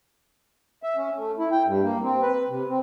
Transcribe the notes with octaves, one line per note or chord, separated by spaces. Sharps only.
E5
C#4
A3
E4
G5
G2
A#3
C4
B4
C3
C4